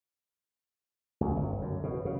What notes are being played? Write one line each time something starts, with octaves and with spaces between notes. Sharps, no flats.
C#2
G1
F#2
B2
C#3